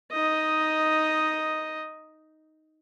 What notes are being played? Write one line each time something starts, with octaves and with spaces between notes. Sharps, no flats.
D#4 D#5